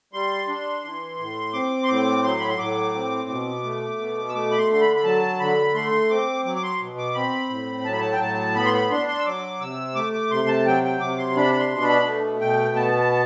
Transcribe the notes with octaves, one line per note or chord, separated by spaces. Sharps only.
G3 C6
D4
E3
A2
C4 D6
C6
A2 D6
F#3 C6
B5
C6
A2 D6
C4
B2
A3
B2
E6
A3 D6
B5
C6
D3 C6
B5
B5
F#3 A5
D3 B5
A3 C6
C4 D6
F#3 D6
D6
C6
B2
D6
C4 B5
A2
F#3 A5
B5
A5
G5
A2 A5
B3 B5
C6
B5
D4 C6
C6
E6
F#3 D6
C3 E6
A3 D6
D6
C3 C6
A5
F#3 G5
G5
C3 D6
C6
D4 B5
C6
B2
B5
A3
B2 G5
B3 A5